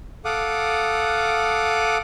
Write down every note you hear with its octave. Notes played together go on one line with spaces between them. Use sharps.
A4 F5 F#5 D6 D#6